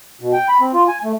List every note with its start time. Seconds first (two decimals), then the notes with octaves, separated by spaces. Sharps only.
0.21 B2
0.33 G5
0.49 B5
0.61 C4
0.74 F4
0.88 G#5
1.04 A3